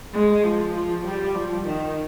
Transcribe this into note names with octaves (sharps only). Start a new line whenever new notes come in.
G#3
F3
F3
G3
F3
D#3